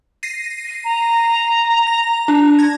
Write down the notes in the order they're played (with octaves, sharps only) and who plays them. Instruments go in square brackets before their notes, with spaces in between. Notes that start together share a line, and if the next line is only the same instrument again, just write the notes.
[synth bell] A#6 C7 D#7
[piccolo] A#5
[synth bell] A#6
D4
G#6 A#6